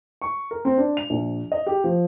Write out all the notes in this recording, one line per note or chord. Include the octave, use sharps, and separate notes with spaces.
C#6
A#4
C4
D4
F7
A#1
D#5
G4
F3